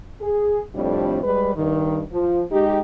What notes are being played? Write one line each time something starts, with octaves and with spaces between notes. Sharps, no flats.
G#4
F2 A2 C3 G3 D4
G3 G#3 B4
G2 D#3
F3
G#3 D#4 G4